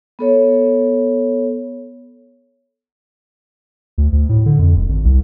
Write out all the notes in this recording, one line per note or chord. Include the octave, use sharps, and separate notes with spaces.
B3 A4 C#5
D2
D2
A2
D3
F2
E1
G#1
C2